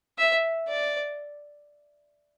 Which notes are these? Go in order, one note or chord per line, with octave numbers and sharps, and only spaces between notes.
E5
D5